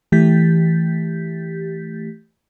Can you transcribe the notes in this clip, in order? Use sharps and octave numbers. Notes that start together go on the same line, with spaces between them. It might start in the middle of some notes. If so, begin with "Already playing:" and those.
E3 A3 G4 G6 A6 B6